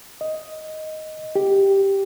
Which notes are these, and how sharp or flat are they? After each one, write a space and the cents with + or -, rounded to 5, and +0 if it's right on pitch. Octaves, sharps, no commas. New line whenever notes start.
D#5 +5
G4 +0